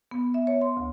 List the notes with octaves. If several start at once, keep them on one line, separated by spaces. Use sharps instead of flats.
B3
E5
C#5
C6
D2